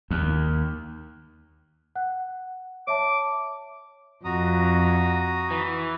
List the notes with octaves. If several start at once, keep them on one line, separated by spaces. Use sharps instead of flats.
D#2
F#5 F#6
C#5 E5 A5 D6
F2 F#4 A#5 D#6
E3